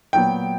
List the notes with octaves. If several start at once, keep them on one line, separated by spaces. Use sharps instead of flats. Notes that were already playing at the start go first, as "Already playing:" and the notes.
A#2 F#3 B3 G5